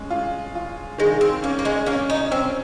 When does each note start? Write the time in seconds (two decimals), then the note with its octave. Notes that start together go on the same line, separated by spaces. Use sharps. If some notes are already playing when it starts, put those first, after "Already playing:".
Already playing: G#3 C#4
0.10 F4
0.55 F4
0.98 D#3 G#3
1.21 C4
1.42 A#3 C#4
1.59 A#3
1.65 G#3
1.86 A#3 C#4
2.10 D#4
2.31 C4 C#4